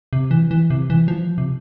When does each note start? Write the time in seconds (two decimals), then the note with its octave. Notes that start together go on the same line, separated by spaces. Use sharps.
0.13 C3
0.31 E3
0.51 E3
0.70 C3
0.90 E3
1.08 F3
1.38 C3